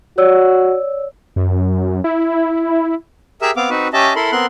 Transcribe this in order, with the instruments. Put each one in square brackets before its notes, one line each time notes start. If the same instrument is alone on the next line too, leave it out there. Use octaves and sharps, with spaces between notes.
[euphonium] F#4 [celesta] C#5 D5 E6
[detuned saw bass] F#2
E4
[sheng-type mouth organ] G4 G#4 A#4 E5 E6
B3 C4 F5 D6
C4 D#4 F#4 B4
C#4 G4 D#5 E5 A5
E4 A4 A#4 B5 C6
B3 C4 A#4 C6 F#6